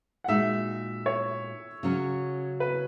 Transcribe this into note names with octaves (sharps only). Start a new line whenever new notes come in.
F#5
A#2 G#3 D#4 F#4 E5
C#5
C#3 F#3 C#4
B4